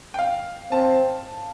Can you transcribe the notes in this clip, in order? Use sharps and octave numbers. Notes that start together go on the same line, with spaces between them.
G5
F5
C4 A5